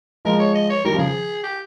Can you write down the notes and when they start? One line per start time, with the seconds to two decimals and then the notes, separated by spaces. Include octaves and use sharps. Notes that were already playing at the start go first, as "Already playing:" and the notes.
0.25 F3 G#3 A#4
0.39 C#5
0.55 D#5
0.70 C#5
0.85 D#3 G3 A#4
0.94 C#3 F3
0.99 G#4
1.44 G4